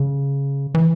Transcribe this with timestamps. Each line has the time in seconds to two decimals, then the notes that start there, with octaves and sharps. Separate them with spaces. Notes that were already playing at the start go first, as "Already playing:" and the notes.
Already playing: C#3
0.75 E3